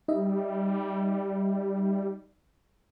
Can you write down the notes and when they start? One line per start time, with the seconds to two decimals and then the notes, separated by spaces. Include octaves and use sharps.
0.08 G3 D#4 D#5 E5